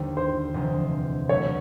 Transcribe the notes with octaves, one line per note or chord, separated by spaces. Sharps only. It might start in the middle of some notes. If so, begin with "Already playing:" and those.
Already playing: D#2 D3 G3 A#3 C5
C5
E1 D2 C3 F3 G#3
B2 F#3 A3 C#5